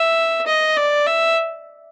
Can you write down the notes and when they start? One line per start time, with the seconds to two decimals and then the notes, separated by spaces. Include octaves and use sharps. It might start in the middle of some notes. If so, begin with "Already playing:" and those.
Already playing: E5
0.47 D#5
0.76 D5
1.07 E5